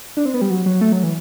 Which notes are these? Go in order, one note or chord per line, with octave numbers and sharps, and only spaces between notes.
D4
C4
B3
G3
F#3
F#3
A3
F#3
E3